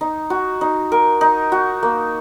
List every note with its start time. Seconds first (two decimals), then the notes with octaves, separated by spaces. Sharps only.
0.01 D#4
0.30 F#4
0.61 D#4
0.92 A#4
1.21 D#4
1.52 F#4
1.83 A#3